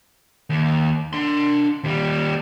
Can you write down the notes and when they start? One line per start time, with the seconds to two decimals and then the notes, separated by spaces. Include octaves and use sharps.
0.50 D#2
1.13 D4 C6
1.84 D#2 G3